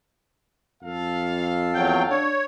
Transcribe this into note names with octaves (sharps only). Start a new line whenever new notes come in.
F2 A4 F5
E2 F#3 G5
D4 C#5